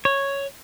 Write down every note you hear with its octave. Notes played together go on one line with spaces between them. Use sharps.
C#5